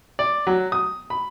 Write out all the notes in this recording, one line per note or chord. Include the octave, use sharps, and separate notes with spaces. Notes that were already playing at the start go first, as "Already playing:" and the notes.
D5
F#3
D#6
B5